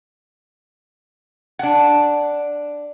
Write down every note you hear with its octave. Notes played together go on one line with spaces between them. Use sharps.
D4 F#5